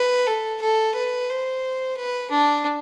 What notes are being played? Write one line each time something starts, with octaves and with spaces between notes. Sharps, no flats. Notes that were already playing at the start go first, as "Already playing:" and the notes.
Already playing: B4
A4
A4
B4
C5
B4
D4